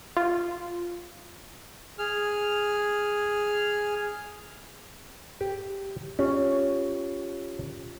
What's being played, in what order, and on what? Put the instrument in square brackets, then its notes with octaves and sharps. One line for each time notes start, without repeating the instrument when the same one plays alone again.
[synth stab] F4
[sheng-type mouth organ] G#4 F6
[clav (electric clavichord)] G4
[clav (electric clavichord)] C#4 [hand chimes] F4 G4 C#5